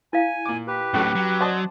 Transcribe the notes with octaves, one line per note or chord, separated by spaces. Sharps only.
E4 F5 G#5
A#2 D6
G4 B4
A2 F#3 C#4 F#4 A4 C#6
F#3
C5 D5 D#5 F#5 A5